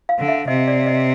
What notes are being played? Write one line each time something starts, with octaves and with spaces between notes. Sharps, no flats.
F5
D3
E5
C3 D#5
D5
D#5